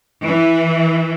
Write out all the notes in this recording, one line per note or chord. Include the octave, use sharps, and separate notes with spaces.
E3